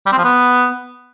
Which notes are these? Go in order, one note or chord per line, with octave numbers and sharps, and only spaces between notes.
G3
C4
F3
B3